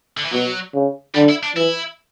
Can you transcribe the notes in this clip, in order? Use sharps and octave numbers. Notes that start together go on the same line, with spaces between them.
D3
E3
B2 F#3
C#3
D3 G3
E4
D4
E3 E4